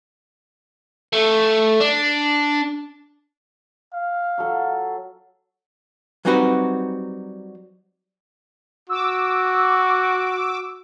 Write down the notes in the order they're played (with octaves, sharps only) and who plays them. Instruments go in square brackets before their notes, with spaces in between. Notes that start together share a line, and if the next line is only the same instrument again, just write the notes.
[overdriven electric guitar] A3
D4
[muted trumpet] F5
[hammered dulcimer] F#3 A4
[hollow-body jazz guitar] F#3 G3 C4 D#4 F#4 B4
[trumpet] F#4 [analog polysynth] D6 E6